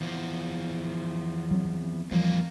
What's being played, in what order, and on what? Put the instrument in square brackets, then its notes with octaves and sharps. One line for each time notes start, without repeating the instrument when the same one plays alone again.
[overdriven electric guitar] E2 F3
[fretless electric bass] F#3 C4
[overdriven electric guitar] F2 A#3 [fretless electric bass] E3 F3 G3